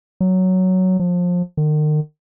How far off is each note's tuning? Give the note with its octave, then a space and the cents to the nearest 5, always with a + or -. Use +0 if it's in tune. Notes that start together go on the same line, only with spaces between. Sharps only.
F#3 +5
F3 +25
D#3 -40